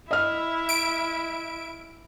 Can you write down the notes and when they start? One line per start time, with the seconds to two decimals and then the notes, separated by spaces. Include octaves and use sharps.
0.11 E4 D#5 E5 F6
0.69 D7